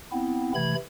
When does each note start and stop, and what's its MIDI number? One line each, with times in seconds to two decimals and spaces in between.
0.12 0.52 59
0.12 0.52 60
0.12 0.52 64
0.55 0.75 48
0.55 0.75 52
0.55 0.75 57
0.55 0.75 83
0.55 0.75 92